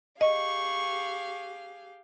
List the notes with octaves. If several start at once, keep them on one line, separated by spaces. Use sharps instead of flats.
G4 G#4 D#5 F5 C#6